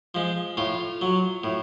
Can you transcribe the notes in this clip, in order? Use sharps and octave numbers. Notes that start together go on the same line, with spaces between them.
F3 G#3
A2 F4
F#3
A2